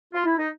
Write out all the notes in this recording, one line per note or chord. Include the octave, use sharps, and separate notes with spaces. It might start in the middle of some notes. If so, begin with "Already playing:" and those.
F4
E4
D#4